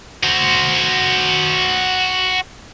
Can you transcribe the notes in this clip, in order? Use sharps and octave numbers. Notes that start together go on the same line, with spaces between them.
F#4 C5